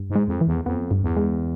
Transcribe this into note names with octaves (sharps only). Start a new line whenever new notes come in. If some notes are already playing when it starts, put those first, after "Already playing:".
Already playing: G2
G#2
G#3
F2
E3
E2
F2 B3
G2
E2
G#3